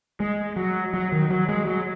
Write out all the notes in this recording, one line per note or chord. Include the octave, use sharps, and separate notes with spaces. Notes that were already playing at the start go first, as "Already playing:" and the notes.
G#3
F#3
F#3
D#3
F#3
G#3
F#3